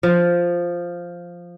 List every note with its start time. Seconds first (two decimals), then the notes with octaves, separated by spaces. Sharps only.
0.03 F3